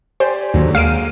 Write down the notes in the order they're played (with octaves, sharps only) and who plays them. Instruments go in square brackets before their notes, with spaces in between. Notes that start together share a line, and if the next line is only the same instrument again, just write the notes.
[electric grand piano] G4 D5 G#5 [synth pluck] C5
[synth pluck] D#2 [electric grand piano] G#2 D3 F#3
[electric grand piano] G#3 A#3 [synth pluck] F5 D7 D#7